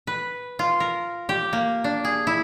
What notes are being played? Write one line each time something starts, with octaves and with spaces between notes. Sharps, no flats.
B4
F4
A#4
G4
A#3
D4
G#4
E4